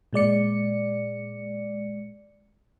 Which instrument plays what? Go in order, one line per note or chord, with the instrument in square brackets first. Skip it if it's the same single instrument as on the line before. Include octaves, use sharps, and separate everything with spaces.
[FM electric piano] A#2 G#3 D5 C#7